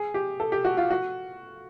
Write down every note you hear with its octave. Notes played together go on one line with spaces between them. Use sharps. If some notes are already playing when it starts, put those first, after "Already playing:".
Already playing: G#4
G4
A4
G4
F#4
F4
F#4